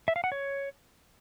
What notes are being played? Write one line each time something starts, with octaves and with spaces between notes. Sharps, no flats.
E5
F5
F#5
C#5